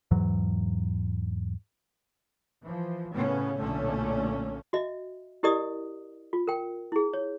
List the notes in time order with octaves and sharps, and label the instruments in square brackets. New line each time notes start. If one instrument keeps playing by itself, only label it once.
[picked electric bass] E2 G#2 E3 F#3
[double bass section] E3 F3
A2 C#3 B3 C#4
B1 A#2 D3 A3 C#4
[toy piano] F#4 D#5 E5
E4 G4 A#4 D5 D#5 D#6
F4
A#4 G5
E4 G#4
C#5